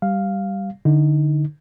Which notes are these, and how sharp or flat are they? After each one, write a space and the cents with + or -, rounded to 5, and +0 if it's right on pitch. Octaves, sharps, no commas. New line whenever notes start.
G3 +0 F5 +0
D3 +15 D#4 +25